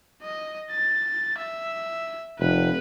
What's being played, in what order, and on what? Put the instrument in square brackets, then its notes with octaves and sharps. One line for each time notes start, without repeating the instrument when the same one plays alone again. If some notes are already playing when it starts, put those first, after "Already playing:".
[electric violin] D#5
A6
E5
[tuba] F1 [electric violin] B4